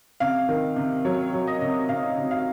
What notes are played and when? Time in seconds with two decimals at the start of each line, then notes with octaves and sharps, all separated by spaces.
0.20 C3 F5
0.49 D#3
0.76 C3
1.05 F#3 C#5
1.33 F#3
1.47 D#5
1.61 C3
1.89 C3 F5
2.17 C3
2.31 F5